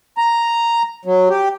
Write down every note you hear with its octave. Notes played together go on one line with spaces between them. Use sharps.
A#5
F#3
G4